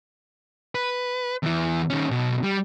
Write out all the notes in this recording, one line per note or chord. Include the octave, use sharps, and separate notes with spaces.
B4
E2 E3
D#3 C#4
B2 F#3
G3